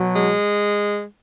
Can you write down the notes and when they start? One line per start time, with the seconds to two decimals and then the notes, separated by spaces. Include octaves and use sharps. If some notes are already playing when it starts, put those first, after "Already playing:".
Already playing: B2 F#3
0.13 G#3